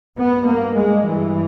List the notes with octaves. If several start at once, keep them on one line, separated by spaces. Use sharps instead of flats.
G2 B3
A#3
G#3
E3